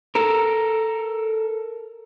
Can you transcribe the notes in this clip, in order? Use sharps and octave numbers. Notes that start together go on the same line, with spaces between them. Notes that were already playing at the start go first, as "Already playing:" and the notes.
A4 A#4